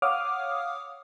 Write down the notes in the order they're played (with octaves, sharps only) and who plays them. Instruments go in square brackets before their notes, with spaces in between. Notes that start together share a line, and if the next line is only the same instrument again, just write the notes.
[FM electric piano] C#5 F5 F#5 D6 D#6 F6